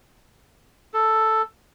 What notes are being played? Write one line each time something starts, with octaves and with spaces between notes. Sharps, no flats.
A4